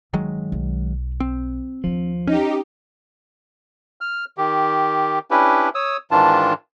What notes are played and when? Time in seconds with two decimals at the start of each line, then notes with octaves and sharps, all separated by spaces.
0.13 G1 D#3 F#3 G#3
0.52 B1
1.20 C4
1.84 D#2 F3 D4
2.27 C#4 D#4 G4
4.01 F6
4.38 D#3 G4
5.31 C#4 D4 E4 G4 B4
5.75 C#5 D#6 E6
6.11 G#2 D#3 E3 D4 F4 A5